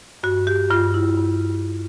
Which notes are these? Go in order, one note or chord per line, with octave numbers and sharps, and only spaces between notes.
G2 F#4
G4
G2 F4
E4
G2